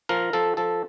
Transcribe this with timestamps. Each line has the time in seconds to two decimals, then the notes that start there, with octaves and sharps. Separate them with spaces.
0.09 F3 A#4
0.33 F3 A4
0.57 F3 A4